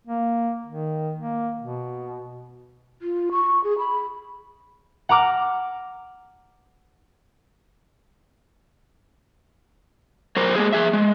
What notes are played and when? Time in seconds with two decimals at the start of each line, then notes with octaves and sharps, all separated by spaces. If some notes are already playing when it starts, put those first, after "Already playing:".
0.07 A#3
0.67 D#3
1.19 A#3
1.59 B2
3.02 F4
3.31 C#6
3.64 G#4
3.78 B5
5.09 F#5 A#5 D6 F6
10.36 F#3 A#4 C5
10.56 G#3 A#3 G#4
10.73 G#4 E5
10.93 G#3